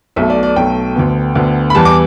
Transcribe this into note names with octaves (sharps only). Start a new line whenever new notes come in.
B1 B2 A3 E5
D5
D5
B1 B2 A3 G5
D2 D3 B3
D2 D3 B3
B5
E2 E3 G3 A5
D6